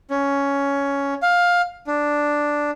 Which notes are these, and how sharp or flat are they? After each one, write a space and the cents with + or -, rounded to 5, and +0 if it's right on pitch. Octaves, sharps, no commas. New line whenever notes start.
C#4 +10
F5 +15
D4 +0